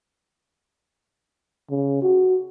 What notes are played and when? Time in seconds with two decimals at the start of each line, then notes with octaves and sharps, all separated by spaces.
1.70 C#3
2.02 F#4